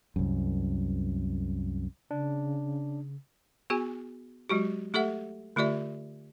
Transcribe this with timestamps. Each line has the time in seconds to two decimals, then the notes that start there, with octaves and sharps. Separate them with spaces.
0.16 C2 F#2
2.11 C#3 D4
3.70 B3 F#4 G#4 G#5
4.49 F#3 G#3 F#4 G4
4.94 A3 G4 A4 E5 F#5
5.56 D3 A3 F4 G4 D5 E5